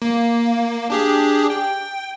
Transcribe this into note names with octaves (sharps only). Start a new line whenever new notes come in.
A#3
D4 G4 G#4
G5